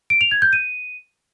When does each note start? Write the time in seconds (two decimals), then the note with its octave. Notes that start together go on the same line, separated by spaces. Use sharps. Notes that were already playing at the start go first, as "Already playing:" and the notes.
0.10 D7
0.21 F7
0.31 G#6
0.42 G6
0.53 D#7